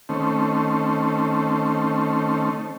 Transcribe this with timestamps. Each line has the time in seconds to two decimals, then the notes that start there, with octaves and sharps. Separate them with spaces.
0.09 D#3 A3 C4 C#4